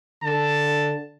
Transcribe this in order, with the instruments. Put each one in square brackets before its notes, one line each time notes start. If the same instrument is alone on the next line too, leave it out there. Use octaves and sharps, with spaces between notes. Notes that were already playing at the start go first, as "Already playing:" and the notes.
[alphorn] D3 [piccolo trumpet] A5